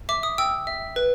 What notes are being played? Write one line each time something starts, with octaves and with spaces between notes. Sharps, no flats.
E5 D6
D#6
G5 E6
E5
B4